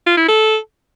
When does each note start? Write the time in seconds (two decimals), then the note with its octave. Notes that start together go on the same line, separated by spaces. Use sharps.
0.06 F4
0.17 E4
0.28 A4